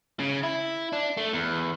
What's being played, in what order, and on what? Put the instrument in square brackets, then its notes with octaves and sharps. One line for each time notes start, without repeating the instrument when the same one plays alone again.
[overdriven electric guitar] C#3
E4
D4
A3
E2